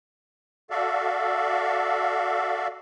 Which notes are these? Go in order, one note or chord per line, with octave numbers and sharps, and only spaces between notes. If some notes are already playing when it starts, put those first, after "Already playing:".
F#4 A4 D5 E5 F5